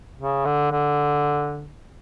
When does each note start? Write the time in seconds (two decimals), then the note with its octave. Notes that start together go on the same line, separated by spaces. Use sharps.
0.17 C#3
0.45 D3
0.72 D3